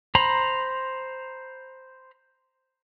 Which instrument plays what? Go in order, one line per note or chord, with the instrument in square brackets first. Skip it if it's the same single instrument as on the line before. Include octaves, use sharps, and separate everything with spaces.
[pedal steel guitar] C5 A#5 B5